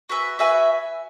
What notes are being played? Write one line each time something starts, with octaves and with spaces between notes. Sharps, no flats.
F#4 B4 E5 G#5
F#4 B4 E5 G#5